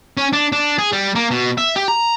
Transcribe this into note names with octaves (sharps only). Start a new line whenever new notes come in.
C#4
D4
D4
G#4
G3
A#3
B2
E5
G4
A#5